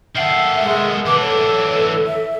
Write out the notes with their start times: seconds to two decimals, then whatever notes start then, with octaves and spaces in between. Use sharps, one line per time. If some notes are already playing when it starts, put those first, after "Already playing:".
0.16 D#3 A4 E5 F#5 C7 F#7
0.62 G#3
1.06 E3 D4 B4 D6
1.20 A4 C#5
2.06 E5